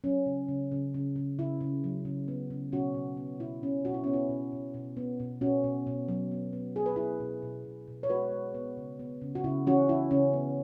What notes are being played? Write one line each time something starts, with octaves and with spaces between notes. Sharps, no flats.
F#3 C#4
C#3
C#3
C#3
C#3
C#3
C#3 E4
C#3
F#3
C#3
B3
C#3
B2 C#4 F#4
B2
B3
B2 E4
B2 C#4
B2 F#4
E4
B3 C#4
E4
B2
B2
B2
B3
B2
B2 C#4 F#4
B2
B2
F#3
B3
B3
B3 G#4
B4
B3 E4 G#4
B2
B2
B2
B2
C#5
G#3 F#4 B4
G#3
B3
C#3
B3
C#3
F#4
C#3 E4
E3 C#4 F#4
E3 E4
C#3 C#4
B3